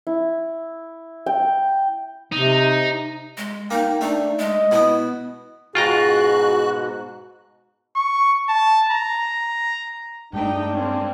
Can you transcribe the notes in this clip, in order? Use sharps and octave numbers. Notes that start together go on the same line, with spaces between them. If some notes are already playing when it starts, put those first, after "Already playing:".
E4
G5
C3 D#4
G#3
A#3 D#4 G5
A3 D4 D#4
G#3 D#5
B2 B3 E4
G#2 B2 F4 F#4 G#4 G5 A#5 F#6
C#6
A5
A#5
G2 G#3 A3 D4 D#4 G5
A#3 C4 C#4